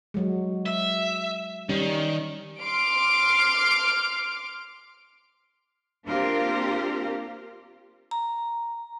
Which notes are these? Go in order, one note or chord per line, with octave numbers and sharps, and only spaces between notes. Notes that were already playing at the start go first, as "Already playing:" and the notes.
F#3 G#3
E5
D#3 G3 C#4
C6 D6 F6 D7
A#3 C4 D4 F4 G4 A#4
A#5